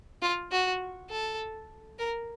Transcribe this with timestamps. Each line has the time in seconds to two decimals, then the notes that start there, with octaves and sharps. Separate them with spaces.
0.22 F4
0.52 F#4
1.10 A4
1.99 A#4